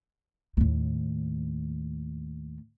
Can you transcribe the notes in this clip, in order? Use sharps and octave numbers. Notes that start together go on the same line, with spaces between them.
D#2 A2